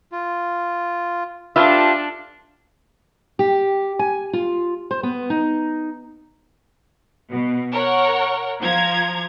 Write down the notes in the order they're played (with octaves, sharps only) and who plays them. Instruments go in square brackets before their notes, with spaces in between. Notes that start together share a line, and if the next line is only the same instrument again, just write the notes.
[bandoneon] F4
[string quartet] D4 A4 [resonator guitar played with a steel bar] F4 [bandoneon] G4 [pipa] B4 E5
[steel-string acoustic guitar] G4
G#5
F4
C5
B3
D#4
[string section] B2
A#4 C#5 F#5
F3 A#5 G#6